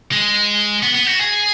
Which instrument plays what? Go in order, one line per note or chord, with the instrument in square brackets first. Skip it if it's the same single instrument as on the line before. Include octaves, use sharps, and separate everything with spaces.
[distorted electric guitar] G#3
B3
B3
F#4
G#4